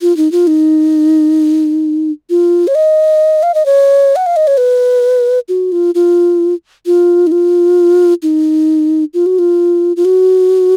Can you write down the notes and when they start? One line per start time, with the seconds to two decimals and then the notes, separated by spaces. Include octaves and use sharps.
0.02 F4
0.17 D#4
0.32 F4
0.47 D#4
2.30 F4
2.67 C#5
2.75 D#5
3.43 F5
3.54 D#5
3.66 C#5
4.16 F#5
4.26 F5
4.36 D#5
4.47 C#5
4.57 B4
5.49 F#4
5.72 F4
5.95 F4
6.86 F4
7.27 D#4
7.32 F4
8.22 D#4
9.14 F4
9.26 F#4
9.39 F4
9.97 F4
10.05 F#4